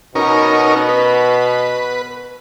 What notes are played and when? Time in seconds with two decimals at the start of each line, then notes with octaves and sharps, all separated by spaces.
0.15 B2 C#4 D#4 A#4
0.89 B4